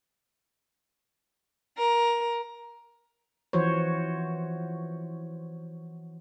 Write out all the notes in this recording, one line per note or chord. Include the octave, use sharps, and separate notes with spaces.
A#4
E3 F3 F#4 C5 C#5